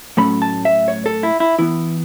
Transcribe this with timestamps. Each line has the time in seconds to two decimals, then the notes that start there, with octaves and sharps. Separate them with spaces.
0.17 A2 F#3 A3 C#4 B5
0.42 A5
0.65 E5
0.88 C#5
1.06 A4
1.23 E4
1.40 E4
1.59 E3 B3 E4